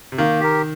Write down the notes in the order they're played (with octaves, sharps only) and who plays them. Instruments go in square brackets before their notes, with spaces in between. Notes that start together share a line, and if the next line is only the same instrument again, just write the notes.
[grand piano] C3
[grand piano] D#3 [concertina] A#3
[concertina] G4 A#4